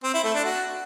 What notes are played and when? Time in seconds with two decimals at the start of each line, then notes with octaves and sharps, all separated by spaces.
0.04 C4
0.14 E4
0.24 A3
0.34 D4
0.45 F#4